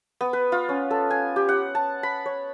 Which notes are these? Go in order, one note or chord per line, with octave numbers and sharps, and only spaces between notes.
B3
B4
F4
C#4
A4
G#5
G4
F#5
A5
B5
C#5